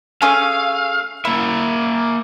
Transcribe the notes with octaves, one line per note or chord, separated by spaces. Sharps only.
A3 C#4 G#4 F5
A#3 E4 E5